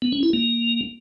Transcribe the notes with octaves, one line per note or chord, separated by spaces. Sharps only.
B3
C#4
E4
A#3